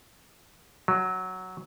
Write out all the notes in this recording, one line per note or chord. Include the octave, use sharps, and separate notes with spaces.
F#3